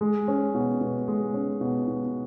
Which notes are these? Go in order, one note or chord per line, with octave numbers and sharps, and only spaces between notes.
G#3
C#4
B2
B2
G#3
C#4
B2
B2